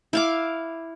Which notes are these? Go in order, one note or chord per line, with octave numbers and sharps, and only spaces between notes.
E4 F5 D6